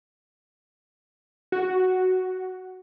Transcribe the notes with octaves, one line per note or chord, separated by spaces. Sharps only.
F#4